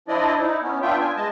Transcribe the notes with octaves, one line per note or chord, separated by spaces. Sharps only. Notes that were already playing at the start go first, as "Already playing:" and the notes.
F3 D4 E4 D5 D#5
D#4 E4
B3 C#4
B3 D4 F4 E5 G5
G#5
G#3 D#5 A5